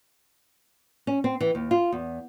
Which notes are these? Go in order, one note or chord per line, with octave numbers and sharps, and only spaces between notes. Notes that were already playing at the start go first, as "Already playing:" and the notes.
C#4
C4
E3
D#2
F4
E2